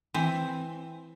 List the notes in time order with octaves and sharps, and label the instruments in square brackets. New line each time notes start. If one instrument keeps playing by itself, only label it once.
[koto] E3 C4